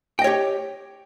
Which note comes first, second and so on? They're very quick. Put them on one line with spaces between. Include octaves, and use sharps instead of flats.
G5 D#5 C#5 G4